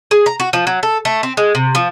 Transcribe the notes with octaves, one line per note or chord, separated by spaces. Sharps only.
G#4
A#5
F#4
F3
F#3
A4
A3
C4
G#3
C3
F3